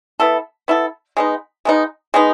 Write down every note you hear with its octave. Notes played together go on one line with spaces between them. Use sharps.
B3 E4 A4
B3 E4 A4
G#3 B3 D#4
G#3 B3 D#4
G#3 B3 D#4